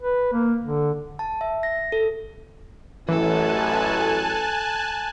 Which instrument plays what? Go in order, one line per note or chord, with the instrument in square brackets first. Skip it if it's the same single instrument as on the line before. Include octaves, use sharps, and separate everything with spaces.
[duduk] B4
A#3
D3
[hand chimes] A5
E5
A#6
A4
[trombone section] A1 F#2 [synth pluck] E3 [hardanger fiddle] A4 [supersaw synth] G#5 A5 F#6